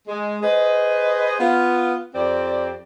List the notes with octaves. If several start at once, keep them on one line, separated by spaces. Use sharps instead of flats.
G#3
G#4 B4 C5 D#5
B3 F4
F2 C4 G4 D5